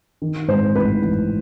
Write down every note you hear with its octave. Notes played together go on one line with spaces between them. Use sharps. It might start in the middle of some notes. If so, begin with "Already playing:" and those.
D#3
G#2 C5
A1 B4
A1